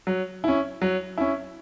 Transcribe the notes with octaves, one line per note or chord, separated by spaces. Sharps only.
F#3
C#4 E4
F#3
C#4 E4